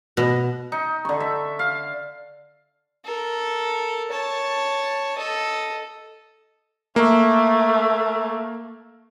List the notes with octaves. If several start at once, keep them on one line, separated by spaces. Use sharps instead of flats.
B2
D#4
D3 C#6
E5
F5
A4 A#4
C#5 A5
A4 D#5
A3 A#3